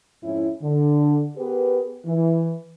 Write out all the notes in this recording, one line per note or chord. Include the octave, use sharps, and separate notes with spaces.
F2 G#2 C#4 E4
D3
B3 G4 G#4 A#4 B4
E3